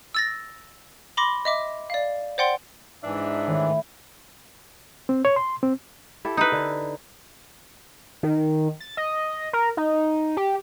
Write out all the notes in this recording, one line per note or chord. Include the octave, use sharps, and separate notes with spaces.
E6 A6 A#6
B5 C6 D6 A#6
D#5 E5 D6
D5 F5
C5 D5 F#5 G5 C6
G#2 E3 D4 E5
A2 D#3 E4
C4
C#5
C6
C4
E4 G4 A4
D#4 B4
D3
D#3
A6
D#5
A#4
D#4
G4